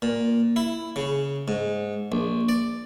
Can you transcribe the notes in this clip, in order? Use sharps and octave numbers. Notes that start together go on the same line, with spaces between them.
A#2
E4
C#3
G#2
A#1
D5